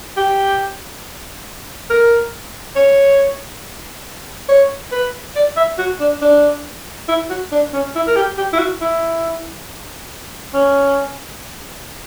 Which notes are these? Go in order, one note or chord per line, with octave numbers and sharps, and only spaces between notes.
G4
A#4
C#5
C#5
B4
D5
E5
F#4
D4
D4
E4
F#4
D4
C#4
E4
A#4
G4
G4
E4
F#4
E4
C#4